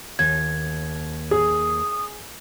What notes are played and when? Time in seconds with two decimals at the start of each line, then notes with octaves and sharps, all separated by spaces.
0.19 D#2 G#6
1.31 G#4 D#6